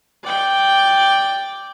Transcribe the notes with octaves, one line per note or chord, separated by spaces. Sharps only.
D5 G5